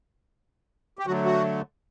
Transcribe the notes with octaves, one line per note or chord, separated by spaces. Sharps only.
G4
D3 F#3 A3 F#4
F#4